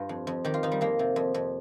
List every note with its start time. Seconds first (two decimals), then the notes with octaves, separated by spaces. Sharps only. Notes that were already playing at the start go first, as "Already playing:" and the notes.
Already playing: G2 F4
0.09 F2
0.27 F2
0.45 D#3 G4
0.54 F4
0.63 D#3 D#4
0.72 G3
0.81 F2 A#3
0.99 C3
1.16 F2
1.34 F2